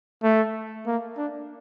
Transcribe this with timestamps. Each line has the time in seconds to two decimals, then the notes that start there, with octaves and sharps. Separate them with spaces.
0.23 A3
0.87 A#3
1.17 D4